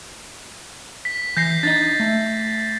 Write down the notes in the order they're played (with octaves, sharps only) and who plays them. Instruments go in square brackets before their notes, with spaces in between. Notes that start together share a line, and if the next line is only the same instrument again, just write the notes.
[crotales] B6
[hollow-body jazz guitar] E3 [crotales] G6 A#6 C7
[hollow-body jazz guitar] D4 D#4 D#5 [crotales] A6
[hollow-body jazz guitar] A3